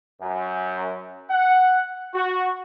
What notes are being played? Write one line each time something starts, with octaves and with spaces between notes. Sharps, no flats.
F#2
F#5
F#4